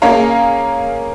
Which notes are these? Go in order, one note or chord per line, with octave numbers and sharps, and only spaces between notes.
A#3 C#4 G#4 C#5 F5 A#5